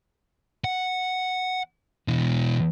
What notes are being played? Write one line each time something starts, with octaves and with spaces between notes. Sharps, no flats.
F#5
B2 E3